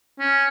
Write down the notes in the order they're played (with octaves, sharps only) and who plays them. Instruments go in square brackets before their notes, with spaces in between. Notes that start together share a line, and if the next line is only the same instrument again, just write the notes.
[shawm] C#4